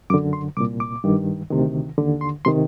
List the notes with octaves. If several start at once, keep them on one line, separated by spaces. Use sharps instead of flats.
F#2 D3 D6
C6
C2 A#2 D6
D6
G2 D#3
D2 C3 D#3
D#2 D3
C6
C3 D#3 C6